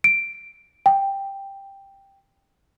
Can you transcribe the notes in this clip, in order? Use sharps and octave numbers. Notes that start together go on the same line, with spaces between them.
D7
G5